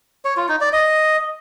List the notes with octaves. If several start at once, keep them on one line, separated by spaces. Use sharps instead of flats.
C#5
F4
D#4
D5
D#5